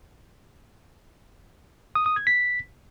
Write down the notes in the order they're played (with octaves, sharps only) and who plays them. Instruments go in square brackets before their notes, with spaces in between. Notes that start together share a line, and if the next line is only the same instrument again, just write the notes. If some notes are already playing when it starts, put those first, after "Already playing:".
[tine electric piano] D#6
D#6
G#6
B6